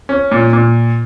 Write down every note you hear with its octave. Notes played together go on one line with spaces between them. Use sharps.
C#4
A#2
A#2